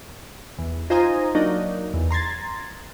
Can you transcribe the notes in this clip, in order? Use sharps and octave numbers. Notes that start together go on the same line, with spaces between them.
E2
D#4 F4 C5 G#5 A#5 D#6
F#3 A#3 D4 D#4
E2
A#5 C6 G#6 A6